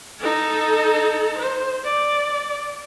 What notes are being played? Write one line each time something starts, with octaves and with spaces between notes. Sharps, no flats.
D#4 A4
C5
D5